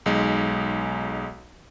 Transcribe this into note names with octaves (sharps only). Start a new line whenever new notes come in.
B1 G#3 D#4